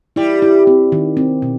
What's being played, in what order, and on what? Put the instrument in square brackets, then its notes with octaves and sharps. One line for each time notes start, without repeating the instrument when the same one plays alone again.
[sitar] G3 [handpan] E4
[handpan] E4
C4
D#3
C4
B2